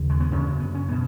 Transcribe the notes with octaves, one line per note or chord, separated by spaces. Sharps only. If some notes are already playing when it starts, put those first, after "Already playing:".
Already playing: D#2 C#3
G#3
B3
F#2 C#3 C#4
B3
C#4
B2 B3